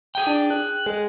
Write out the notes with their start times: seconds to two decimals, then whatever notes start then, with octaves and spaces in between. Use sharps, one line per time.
0.15 G#4 G5
0.27 D4
0.50 F#6
0.86 G#3